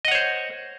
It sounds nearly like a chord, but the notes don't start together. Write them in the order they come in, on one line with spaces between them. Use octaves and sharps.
D#5 F#5 C#5 C5